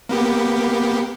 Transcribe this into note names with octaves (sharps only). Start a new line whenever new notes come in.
A#3 B3 G4